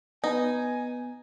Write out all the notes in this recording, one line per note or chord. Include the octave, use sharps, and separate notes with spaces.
B3 D#4 G#5